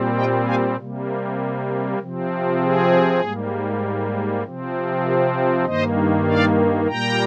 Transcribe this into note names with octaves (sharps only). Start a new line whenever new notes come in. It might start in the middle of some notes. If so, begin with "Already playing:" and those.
Already playing: A#2 G3 C4
D#5 G5
F5 G#5
C3 G3 A#3
C3 F3 C4
G#4
G#2 G3 A#3
C3 F3 C4
G4 A#4
G2 D#3 A#3 C5 D#5
D5 F5
A#2 G3 A#3 G5 A#5